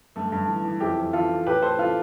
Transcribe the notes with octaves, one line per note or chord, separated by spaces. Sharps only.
G2 A3
G2
E3
E3
F2 E4 G4
F2
E3 F4 A4
E3
A2 G4 B4
A2 A4 C5
E3 F4 A4